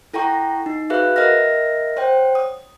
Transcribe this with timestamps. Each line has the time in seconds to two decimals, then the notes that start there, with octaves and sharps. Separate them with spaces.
0.14 E4 A4 F#5 G5 A#5 C#6
0.66 D#4
0.90 F#4 G#4 B4 E5 F5 F#6
1.16 A#4 D#5 E5 F#5 F6 A#6
1.97 C5 C#5 F#5 G5
2.35 D#6